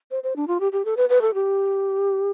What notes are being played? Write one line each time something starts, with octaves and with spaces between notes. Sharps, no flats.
C5
C5
D4
F4
G4
G4
A4
B4
B4
A4
G4